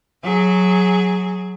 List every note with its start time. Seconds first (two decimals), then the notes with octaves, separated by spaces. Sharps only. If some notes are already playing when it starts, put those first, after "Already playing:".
0.23 F#3 G#4